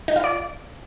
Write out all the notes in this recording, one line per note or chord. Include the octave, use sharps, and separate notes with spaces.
D#4
F4
D5